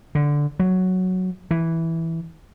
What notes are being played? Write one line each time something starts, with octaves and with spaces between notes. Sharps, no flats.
D3
F#3
E3